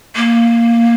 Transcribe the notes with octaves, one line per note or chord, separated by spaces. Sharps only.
A#3